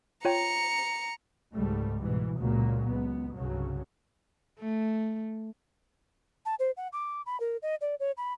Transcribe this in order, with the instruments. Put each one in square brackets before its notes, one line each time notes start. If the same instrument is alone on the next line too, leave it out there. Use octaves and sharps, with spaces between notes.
[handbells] F4 C#5 G5 [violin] A#5 C#7
[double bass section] C#2 G#2 G3 A3
G#2 B2 E3
C#2 A#2 F#3 A#3
C#2 B3
C2 G2 C#3 F#3
[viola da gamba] A3
[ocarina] A5
C5
F#5
D6
B5
A#4
D#5
D5
C#5
B5